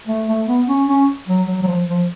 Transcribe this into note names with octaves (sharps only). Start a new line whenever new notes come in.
A3
A3
B3
C#4
C#4
F#3
F#3
F#3
F3
F3